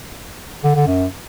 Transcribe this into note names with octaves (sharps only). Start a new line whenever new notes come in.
D3
D3
F#2